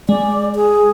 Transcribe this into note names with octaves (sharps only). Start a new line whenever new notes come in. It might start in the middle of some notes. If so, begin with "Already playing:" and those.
G#3 D5
G#4